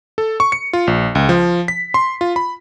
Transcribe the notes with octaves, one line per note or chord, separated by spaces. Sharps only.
A4
C#6
C#7
F4
A#1
C#2
F3
B6
C6
F4
B5